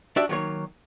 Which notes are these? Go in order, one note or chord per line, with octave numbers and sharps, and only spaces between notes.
D4 F#4 G4 D5 E5
D#3 F#3 A#3 C#5